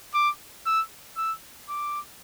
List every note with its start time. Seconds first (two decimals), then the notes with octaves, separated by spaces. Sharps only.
0.14 D6
0.66 E6
1.17 E6
1.69 D6